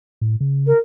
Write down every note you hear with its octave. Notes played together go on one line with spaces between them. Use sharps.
A2
C#3
A#4